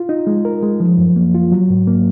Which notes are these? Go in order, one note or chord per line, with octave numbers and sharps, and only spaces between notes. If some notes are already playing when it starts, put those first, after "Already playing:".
Already playing: F4
D#4
G#3
A#4
G#3
F3
F#2
A#3
F4
F#3
G#2
A#3